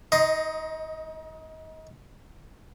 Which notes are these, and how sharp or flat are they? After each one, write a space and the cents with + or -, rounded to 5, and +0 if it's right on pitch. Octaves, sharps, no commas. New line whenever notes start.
D#4 +30 D#5 +0 C6 +0